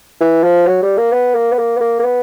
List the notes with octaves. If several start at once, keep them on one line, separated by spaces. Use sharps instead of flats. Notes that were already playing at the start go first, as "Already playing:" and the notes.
E3
F3
F#3
G3
A#3
B3
A#3
B3
A#3
B3
A#3
A#3
B3